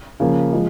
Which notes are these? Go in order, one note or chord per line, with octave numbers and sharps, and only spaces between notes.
C#3 F3 A#3
F3 G#3